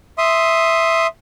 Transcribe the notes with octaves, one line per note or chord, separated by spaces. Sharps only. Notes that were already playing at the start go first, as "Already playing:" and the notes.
E5 C6 D#6